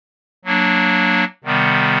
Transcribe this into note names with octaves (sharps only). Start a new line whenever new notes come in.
F#3 A#3 D4
C3 D#3 G3 B3